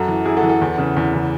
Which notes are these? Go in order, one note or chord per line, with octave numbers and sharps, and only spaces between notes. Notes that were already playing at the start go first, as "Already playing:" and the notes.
Already playing: F#2 F#4 A4
E3
F#2 E4 G#4
F#4 A4
E3
F#4 A4
E2
C#3 E3
E2
C#3 E3